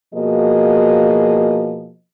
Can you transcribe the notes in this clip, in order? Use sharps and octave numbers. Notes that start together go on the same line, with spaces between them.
B2 F3 A#3 F#4 G#4 D#5